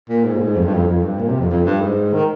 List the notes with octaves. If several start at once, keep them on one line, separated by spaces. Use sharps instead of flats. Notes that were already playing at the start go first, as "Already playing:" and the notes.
A#2
G#2
A#2
G#2
F2
G2
F2
F2
G2
A#2
C3
F2
F2
G2
G#2
D#3